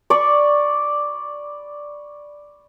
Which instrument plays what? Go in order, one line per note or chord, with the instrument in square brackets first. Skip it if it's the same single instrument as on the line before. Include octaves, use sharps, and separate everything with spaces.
[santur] D5 B5 C#6